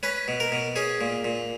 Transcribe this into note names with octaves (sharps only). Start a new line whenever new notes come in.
C#4 B4
B2
A#4
B2
C#4 G#4
A#2
A#2